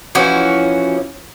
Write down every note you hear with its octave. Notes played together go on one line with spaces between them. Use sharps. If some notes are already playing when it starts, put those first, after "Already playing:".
E3 F3 C#4 F#4